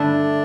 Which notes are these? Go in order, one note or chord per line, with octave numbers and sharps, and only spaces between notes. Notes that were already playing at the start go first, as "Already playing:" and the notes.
Already playing: G2 D3 A3 D4 E4